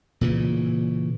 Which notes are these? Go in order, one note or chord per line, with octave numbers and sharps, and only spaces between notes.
A#2 C#3 E3